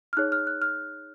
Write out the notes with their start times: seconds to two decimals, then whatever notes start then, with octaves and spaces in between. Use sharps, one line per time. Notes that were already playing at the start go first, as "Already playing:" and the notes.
0.13 F6
0.17 D#4 G#4 C#5 F#6
0.32 F6
0.47 F#6
0.62 F6